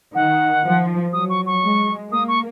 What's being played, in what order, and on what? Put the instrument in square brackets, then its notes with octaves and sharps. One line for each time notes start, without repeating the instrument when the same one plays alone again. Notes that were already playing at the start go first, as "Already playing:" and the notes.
[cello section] D#3 [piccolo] F#5
[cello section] F3
[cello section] F#3 [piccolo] D#6
[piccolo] C#6
C#6
[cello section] G#3
[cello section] A#3 [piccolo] D#6
[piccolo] C#6